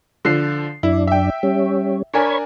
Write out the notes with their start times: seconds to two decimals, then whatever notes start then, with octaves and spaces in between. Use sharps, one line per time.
0.25 D3 F3 C7
0.83 F#2 D4 E4
1.07 E5 G5
1.43 G3 C#4
2.14 D4 A#4 C#5 G#5 B5 G#6